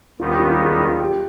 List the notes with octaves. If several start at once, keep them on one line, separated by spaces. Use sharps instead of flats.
D#2 D#3 G3 B3 D#4 F4
G4
F4
F4
G#4
F4
G4